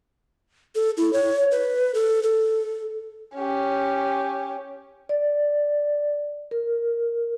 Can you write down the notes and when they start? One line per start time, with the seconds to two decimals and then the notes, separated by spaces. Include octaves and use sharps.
0.75 A4
0.97 E4
1.13 C#5
1.52 B4
1.95 A4
2.23 A4
3.35 C#4 G4
5.09 D5
6.51 A#4